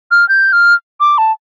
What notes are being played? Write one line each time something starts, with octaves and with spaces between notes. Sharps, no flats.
F6
G6
F6
D6
A5